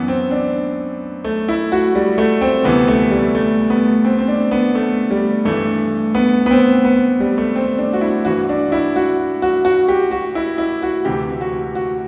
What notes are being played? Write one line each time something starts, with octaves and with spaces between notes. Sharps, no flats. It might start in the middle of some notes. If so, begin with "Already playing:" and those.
Already playing: F#2 E3 B3
C4
D4
A3
E4
F#4
G3
A3
C4
D2 C3 E3 B3
A3
G3
A3
B3
C4
C4
D4
B3
A3
G3
G2 E3 A3
B3
B3
C4
B3
G3
A3
C4
D4
F#4
E4
G2 E3 F#4
D4
E4
F#4
F#4
F#4
G4
F#4
E4
E4
F#4
D2 C3 E3 G4
F#4
F#4